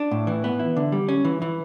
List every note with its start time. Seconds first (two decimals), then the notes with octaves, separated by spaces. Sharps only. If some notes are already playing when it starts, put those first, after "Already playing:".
Already playing: D4
0.11 A2
0.27 E3
0.44 B3
0.59 E4
0.77 D3
0.92 G3
1.09 C#4
1.25 E3
1.42 E3